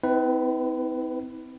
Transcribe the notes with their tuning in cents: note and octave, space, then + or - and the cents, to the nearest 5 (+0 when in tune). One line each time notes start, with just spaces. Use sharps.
C4 -35 E4 -45 B4 +10